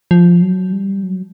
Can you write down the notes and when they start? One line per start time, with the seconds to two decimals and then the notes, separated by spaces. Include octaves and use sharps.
0.11 F3
0.42 F#3
0.72 G3
1.03 F#3